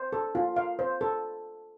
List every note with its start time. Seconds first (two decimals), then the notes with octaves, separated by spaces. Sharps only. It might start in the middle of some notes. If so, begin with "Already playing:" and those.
Already playing: C5
0.13 A4
0.35 F4
0.56 F5
0.79 C5
1.01 A4